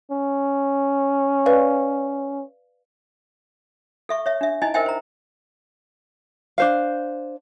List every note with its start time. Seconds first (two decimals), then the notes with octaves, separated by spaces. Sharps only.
0.12 C#4
1.46 B4 D5 F5
4.09 A4 E5 C#6
4.26 C#5 E5
4.41 D4 E5
4.62 D#4 E4 D#5 G#5
4.74 A#4 C5 D#5 E5 G5 G#5
4.86 C5 A#5
6.58 D4 C5 F5